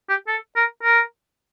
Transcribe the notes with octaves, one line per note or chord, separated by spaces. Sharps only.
G4
A4
A#4
A#4